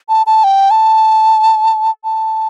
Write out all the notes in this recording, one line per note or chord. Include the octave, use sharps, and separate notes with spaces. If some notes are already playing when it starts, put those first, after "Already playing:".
A5
A5
G5
A5
A5